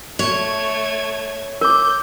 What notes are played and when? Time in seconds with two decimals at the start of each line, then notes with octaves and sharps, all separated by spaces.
0.19 A3 C#5 G#6
1.61 A#4 D6 G6